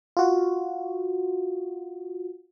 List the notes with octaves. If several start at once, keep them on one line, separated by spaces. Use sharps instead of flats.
F4 F#4